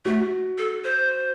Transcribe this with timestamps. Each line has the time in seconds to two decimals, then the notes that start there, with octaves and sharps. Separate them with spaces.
0.05 A3 F#4
0.58 A4
0.84 C5